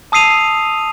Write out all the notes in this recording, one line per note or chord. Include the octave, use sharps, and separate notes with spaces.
A5 D#6 E6 C7 D#7 F7